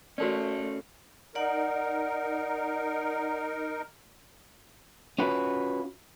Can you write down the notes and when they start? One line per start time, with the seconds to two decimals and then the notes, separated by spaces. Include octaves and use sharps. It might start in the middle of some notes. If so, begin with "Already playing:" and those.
0.18 A3 C#4 F#4 A4 A#4 D5
1.35 D#4 A#4 D5 F#5
5.18 C#4 F4 F#4 B4